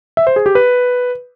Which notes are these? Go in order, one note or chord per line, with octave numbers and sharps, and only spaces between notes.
E5
C5
G#4
G4
B4